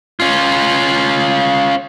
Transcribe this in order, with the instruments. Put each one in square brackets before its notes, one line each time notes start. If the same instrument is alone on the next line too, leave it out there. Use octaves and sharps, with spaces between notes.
[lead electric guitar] C#4 F4